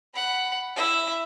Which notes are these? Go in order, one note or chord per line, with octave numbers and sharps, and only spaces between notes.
F#5 B5
E4 E5